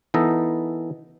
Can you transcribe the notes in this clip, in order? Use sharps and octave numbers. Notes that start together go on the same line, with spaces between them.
E3 B3 D#4 A4 A#4 D#5